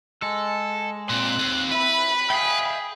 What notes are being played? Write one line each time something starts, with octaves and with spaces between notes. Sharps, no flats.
G#3 A4
A#2 C4 C6 F#6
D#2
E4 B4 B5
G#4 E5 F5 G5